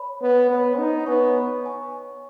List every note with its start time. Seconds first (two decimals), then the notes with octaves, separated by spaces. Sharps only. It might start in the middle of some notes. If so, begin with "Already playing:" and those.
Already playing: C#5 B5
0.21 B3
0.50 B3 C#5 B5
0.79 D#4
1.06 B3 C#5 G#5 C#6
1.64 C#5 G#5 C#6